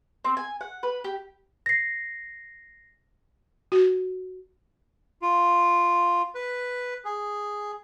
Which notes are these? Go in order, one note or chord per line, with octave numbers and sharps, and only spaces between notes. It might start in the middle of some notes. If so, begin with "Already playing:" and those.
C4
G#5
F#5
B4
G4
A#6 C7
F#4
F4
B4
G#4